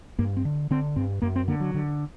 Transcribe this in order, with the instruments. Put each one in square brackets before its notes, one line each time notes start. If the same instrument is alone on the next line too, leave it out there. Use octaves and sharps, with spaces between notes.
[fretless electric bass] G2 A#3
C4
D3
D3 C4
G2 C4
F#2 A#3
C4
D3 A#3
F#3
D3